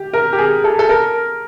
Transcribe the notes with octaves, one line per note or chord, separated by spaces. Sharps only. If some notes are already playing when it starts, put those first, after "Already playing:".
Already playing: G4
A#4
G4
G#4
A4
A4
A#4